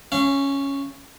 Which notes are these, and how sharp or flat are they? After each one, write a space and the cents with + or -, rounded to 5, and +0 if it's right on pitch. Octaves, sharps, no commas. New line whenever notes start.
C#4 +0 F5 -35